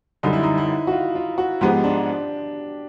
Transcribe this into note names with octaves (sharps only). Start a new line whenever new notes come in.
F#2 D3 G3 D#4
E4
D#4
E4
F#4
F4
F4
F#4
G#2 F3 G#3 B3 G4
D4